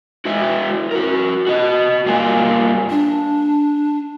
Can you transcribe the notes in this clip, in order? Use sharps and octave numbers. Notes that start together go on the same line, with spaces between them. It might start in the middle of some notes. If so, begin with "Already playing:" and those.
E4 F#4 B4 E5
F#4 A#4
F#4 D#5
G2 A#3 F4 G#5
D4